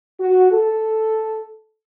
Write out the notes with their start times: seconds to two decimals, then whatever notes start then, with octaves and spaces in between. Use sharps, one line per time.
0.18 F#4
0.52 A4